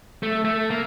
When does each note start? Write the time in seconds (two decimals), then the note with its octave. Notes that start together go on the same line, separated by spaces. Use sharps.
0.23 A3
0.45 A3
0.71 A#3